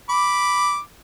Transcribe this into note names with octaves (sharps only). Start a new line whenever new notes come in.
B5 D6